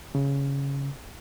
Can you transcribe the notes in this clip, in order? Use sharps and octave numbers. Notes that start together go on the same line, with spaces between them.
C#3